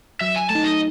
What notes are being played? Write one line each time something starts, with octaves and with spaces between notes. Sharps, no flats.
F#3 E5
G#5
A3 A5
D#4
D#5